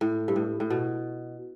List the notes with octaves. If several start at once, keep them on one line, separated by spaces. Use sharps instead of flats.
A2
G2
A2
A2
B2